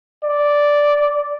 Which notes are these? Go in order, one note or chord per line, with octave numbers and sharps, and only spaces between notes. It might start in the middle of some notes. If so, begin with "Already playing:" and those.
D5